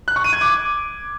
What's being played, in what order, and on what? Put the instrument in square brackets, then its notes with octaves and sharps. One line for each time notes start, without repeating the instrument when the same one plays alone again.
[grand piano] F#6
C#6
D#7
G#6
D6